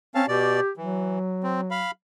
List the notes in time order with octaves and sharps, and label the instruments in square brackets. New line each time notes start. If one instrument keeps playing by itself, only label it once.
[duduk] C4 [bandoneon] C#4 F5 A5
[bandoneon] B2 D5 [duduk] G4
[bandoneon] E3 [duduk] F#3
[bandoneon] C4
F5 B5